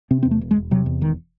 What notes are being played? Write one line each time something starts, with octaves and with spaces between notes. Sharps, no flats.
C3 C4
E2 C4
A3
E1
G#3
E1
C3 F#3
E2
E1 D#3